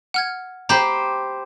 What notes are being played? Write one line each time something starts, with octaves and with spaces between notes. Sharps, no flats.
F#5 F6 G#6
G4 C5 A#5 B5 G6